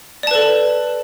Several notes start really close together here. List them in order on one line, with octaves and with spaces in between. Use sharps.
D5 A5 B4 A4